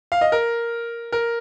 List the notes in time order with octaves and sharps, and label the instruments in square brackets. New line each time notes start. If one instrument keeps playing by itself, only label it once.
[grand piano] F5
D#5
A#4
A#4